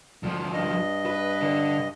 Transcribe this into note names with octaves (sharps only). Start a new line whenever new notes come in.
D2 F3
G2 D#5
B4
D3